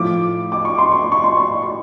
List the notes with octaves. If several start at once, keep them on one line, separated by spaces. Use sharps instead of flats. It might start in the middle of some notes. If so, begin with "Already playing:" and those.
Already playing: A2 F3 D6
D6
C#6
C6
C#6
C#6
C6
C#6
C#6